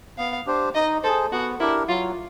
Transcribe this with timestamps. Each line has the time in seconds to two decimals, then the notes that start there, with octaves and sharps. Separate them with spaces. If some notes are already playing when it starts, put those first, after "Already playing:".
0.18 B3 F5
0.47 D4 G4 C5
0.75 D#4 D#5
1.03 A4 C5
1.07 G#4
1.32 B3 F#4
1.60 D4 E4 G4 A#4
1.88 F#3 F4